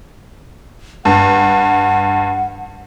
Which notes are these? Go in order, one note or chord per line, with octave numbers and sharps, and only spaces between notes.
G2 F#5